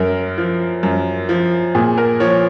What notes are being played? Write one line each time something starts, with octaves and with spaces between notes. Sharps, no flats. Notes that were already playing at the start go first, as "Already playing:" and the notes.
Already playing: F#2 A#4
F3
F#2
F3
A#2 G#4
A#4
F3 C#5